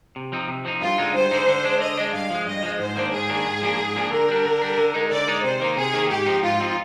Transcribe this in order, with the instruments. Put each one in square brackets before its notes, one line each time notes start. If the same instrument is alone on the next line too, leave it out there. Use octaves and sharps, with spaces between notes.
[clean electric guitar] C3
F3 C4 D#4
C3
F3 C4 D#4
[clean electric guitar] G2 [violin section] F4
[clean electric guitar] D3 G#3 D#4
[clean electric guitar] G2 [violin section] C5
[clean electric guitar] D3 G#3 D#4
D3
G#3 D4
[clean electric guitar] D3 [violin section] D#5
[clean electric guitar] G#3 D4
[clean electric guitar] G2 [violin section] F5
[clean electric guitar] F3 G#3
[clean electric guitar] G2 [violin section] D#5
[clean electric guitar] F3 G#3
[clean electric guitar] G#2 [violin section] C5
[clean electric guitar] D#3 A#3 D4
[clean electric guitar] G#2 [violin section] G#4
[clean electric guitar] D#3 A#3 D4
G#2
F3 A#3 D4
G#2
F3 A#3 D4
[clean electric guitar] D3 [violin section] A#4
[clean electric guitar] G3 D4
D3
G3 D4
D3
G#3 D#4
[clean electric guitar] D3 [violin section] D5
[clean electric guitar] G#3 D#4
[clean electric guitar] C3 [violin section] C5
[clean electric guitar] D#3 A#3 D#4
[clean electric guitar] C3 [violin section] G#4
[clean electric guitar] D#3 A#3 D#4
[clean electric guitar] G#2 [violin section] G4
[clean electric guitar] F3 C4 D#4
[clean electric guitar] G#2 [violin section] F4
[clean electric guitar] F3 C4 D#4